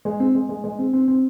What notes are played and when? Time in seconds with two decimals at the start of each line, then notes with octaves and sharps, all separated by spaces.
0.05 G#3
0.20 C4
0.35 G#3
0.49 G#3
0.64 G#3
0.79 C4
0.93 C4
1.08 C4